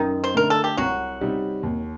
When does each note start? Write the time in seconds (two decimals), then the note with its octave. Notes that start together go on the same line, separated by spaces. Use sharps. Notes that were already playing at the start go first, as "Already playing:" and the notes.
Already playing: F#2 D#3 D#4
0.24 C5
0.35 D3 A3 A#4
0.50 A4
0.64 G4
0.77 C2 F#3 F#4
1.21 C3 G3 C4 D#4
1.63 D#2